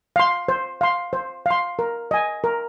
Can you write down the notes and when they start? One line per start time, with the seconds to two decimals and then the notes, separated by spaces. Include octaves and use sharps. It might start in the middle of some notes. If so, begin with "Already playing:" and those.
0.16 F5 C6
0.48 C5
0.81 F5 C6
1.13 C5
1.46 F5 C6
1.79 A#4
2.11 D#5 G#5
2.44 A#4